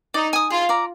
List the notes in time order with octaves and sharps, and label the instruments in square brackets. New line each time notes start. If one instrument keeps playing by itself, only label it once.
[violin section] D#4 [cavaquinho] D5
[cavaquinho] G#5 D#6
[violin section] F4 [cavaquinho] G#4
[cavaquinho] D5 F5 A#5